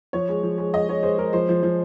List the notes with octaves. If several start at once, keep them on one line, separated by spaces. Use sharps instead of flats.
F3 C#5
G#3
F3
G#3
G#3 D#5
G#3 C#5
G#3 C5
G#3 A#4
F3 C5
F3
F3